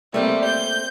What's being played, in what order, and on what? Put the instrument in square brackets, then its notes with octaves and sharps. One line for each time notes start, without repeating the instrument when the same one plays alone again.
[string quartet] G3 [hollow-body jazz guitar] A3 A#3 C4
[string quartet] G6